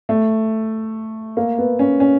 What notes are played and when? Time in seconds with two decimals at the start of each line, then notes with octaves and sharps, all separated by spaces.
0.09 A3
1.37 A#3
1.58 B3
1.79 C#4
2.00 C#4